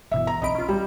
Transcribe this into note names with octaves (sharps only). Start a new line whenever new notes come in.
G1 B2 E3 E5
A#5
B1 C4 D#5 B5 D7
C#4 F4
G3